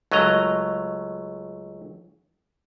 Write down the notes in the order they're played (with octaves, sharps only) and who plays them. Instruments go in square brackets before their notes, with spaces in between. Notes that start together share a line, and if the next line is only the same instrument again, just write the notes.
[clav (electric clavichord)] C#2 F#3 A3 D#5 A#5